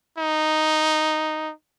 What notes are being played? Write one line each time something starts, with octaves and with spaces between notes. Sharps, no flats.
D#4